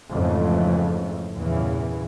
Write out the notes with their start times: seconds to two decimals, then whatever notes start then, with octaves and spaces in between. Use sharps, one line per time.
0.11 F2 G#2 C#3 E3 A3
1.35 E2 G2 A#2 C#3 E3